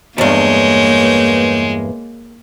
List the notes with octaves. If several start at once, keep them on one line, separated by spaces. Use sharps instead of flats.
E2 G2 G#3 A#3 C#5 G6